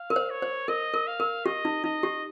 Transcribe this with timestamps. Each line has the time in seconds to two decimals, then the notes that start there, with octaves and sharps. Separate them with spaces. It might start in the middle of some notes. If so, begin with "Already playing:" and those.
Already playing: F5
0.10 A#4
0.16 C5
0.30 C#5
0.42 C5
0.68 A#4 D#5
0.94 A#4
1.07 F5
1.20 A#4
1.45 G4 D#5
1.65 D#4
1.84 D#4 D#5
2.03 G4